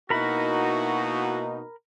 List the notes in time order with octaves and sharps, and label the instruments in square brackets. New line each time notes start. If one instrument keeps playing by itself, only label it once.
[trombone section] B2 A#3 D#4 [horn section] E4 F#4 [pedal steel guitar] A#4 B5